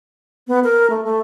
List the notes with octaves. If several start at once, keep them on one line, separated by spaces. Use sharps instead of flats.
B3
A#4
A3
A3